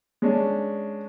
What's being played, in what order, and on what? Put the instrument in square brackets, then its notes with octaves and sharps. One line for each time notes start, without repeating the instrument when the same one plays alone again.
[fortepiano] G#3 C#4 D4